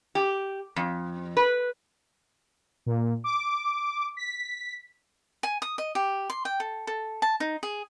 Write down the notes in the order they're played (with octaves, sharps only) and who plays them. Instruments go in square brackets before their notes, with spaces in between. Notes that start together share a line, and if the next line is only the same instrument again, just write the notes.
[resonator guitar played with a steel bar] G4
F2
B4
[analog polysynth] A#2
D6
B6
[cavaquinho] G#5
D#6
D#5
G4
C6
G5
A4
A4
A5
D#4
G#4